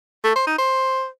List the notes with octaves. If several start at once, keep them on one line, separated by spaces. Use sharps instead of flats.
A3
C5
D#4
C5